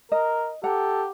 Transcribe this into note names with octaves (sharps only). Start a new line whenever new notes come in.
A#4 D#5
G4 A4 F#5 A#5